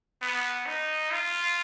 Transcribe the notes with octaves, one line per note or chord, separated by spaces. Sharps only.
B3
D#4
F4